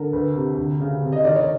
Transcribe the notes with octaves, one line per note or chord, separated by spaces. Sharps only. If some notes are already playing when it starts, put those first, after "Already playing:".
Already playing: D3 A4 A#4
D2 B4
C3
D2
C#3
C3
D#5
D#3 D5
C#5